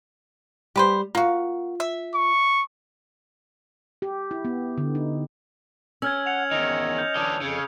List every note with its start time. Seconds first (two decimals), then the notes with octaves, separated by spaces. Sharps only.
0.76 G3 G4 B4 C5
1.15 A#3 F4 F#4 F5
1.80 E5
2.14 C#6
4.02 G4
4.31 E4
4.45 B3
4.78 D3
4.95 D#4
6.02 C#4 E6 F6 G#6
6.26 F#5 C#7 F7
6.52 E2 D#3 D#5 F7
6.98 G6
7.15 D3 E3 D4 D#6
7.41 F2 C#3